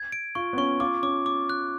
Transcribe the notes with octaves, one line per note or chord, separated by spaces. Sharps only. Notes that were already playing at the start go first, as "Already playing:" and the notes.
Already playing: G#6
D7
F4 C#6
B3
C#4 C#6
F4 D6
C#4 D6
D6
F#6